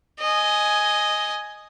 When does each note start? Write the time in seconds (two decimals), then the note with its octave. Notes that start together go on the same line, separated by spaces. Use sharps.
0.20 D#5 G#5